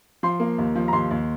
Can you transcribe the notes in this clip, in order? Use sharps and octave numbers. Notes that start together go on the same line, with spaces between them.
F3 C6
A#3
D#2
F3
A#5
D#2 C6
D#2